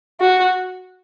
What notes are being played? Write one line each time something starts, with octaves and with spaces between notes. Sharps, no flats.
F#4